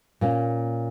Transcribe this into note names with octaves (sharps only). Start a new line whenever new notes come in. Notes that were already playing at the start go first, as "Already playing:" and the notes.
A#2 A#3 C#4